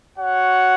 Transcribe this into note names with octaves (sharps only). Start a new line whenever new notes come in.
F#4 C#5 F#5